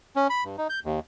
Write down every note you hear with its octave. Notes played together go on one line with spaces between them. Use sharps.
C#4
B5
G2
D#4
G6
D#2